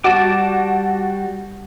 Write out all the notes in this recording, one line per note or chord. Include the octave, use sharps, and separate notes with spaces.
G3 F#4 A5 D6